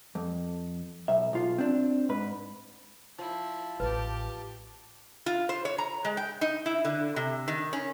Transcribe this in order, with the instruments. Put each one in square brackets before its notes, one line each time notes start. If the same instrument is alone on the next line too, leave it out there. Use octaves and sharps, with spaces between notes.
[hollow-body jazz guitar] F2
B1 E5
B1 F4
C4 D4
G#2 B4
[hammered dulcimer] F3 [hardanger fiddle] E4
[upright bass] A1 [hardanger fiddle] G4 A5 [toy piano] B4
[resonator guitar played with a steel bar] F4
C5
C#5
A#5
G#3
G5
D#4
E4
D3
C3
D#3
C#4